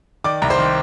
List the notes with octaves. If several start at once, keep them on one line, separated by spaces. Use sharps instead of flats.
D#3 D5 D6
C2 A#5
C5 C6
D#3